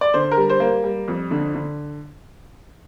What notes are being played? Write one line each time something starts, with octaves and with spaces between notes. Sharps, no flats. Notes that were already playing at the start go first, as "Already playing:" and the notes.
D5
D3 C5
A#4
G3
C5
A#3
G3
F2
D3
D3